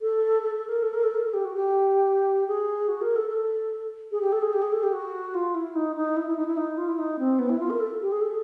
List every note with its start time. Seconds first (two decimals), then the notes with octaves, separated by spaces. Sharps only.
0.01 A4
0.42 A4
0.55 A4
0.68 A#4
0.82 A4
0.93 A#4
1.03 A4
1.14 A#4
1.24 A4
1.33 G4
1.45 F#4
1.54 G4
2.47 G#4
2.88 F#4
3.01 A#4
3.16 A4
3.28 A4
4.11 G#4
4.21 G4
4.32 A4
4.42 G#4
4.53 G4
4.62 G#4
4.72 A4
4.83 G4
4.93 F#4
5.34 F4
5.54 E4
5.75 D#4
5.96 D#4
6.16 E4
6.26 E4
6.37 D#4
6.46 E4
6.57 D#4
6.77 F4
6.88 E4
6.98 D#4
7.19 C4
7.39 B3
7.49 E4
7.59 F4
7.70 A#4
7.80 A4
8.01 G4
8.11 G#4
8.21 A4